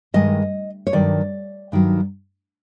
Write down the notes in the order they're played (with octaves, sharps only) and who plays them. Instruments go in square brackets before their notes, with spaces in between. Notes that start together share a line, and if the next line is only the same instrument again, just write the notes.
[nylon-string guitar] G2 D#3 G#3 D#5
C#5
G2 D#3 F#3 D5
G2 D#3 F#3